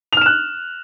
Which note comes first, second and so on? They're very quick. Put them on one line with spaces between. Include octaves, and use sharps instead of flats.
F7 F6 E7 F#6